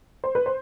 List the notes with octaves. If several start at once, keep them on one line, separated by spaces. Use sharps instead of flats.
C5
B4
C5